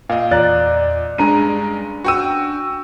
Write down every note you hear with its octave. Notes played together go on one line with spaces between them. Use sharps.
A#2 D#5 F5
E2 F4 D5 A#5 F#6 A6
G2 G#3 C#4 D4 G#5 A#5 D#7
F#4 G5 C#6 E6 D#7